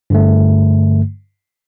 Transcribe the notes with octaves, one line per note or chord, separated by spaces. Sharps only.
G2 D3 A3